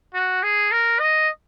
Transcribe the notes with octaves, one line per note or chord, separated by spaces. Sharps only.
F#4
G#4
A#4
D#5